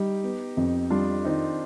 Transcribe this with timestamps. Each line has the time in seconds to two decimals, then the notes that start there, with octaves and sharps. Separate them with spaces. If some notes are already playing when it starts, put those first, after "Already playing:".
Already playing: G3 D#4 G4
0.23 B3
0.57 F2
0.90 G3 D4 F4
1.24 D#3 C4 D#4